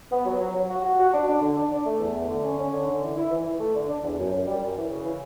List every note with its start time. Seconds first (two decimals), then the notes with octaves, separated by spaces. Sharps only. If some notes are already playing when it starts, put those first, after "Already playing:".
0.12 B3
0.26 F#3
0.41 F#3
0.55 F#3
0.69 F#4
0.84 F#4
0.99 F#4
1.14 D4
1.28 D4
1.42 D3
1.57 D4
1.72 D4
1.86 A3
2.00 E2
2.15 A3
2.29 D3
2.44 C#4
2.58 C#4
2.73 D3
2.87 D3
3.02 E3
3.17 E4
3.30 E3
3.45 E3
3.60 A3
3.75 D3
3.89 D4
4.04 E2
4.19 F#2
4.32 F#2
4.47 G3
4.62 F#2
4.77 E3
4.90 C#3
5.05 E3